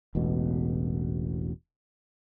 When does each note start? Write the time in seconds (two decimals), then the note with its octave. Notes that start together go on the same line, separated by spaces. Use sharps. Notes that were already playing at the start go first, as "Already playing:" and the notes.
0.15 E1 A1 B2